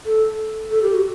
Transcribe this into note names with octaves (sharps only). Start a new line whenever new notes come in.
A4
A4
G4
F#4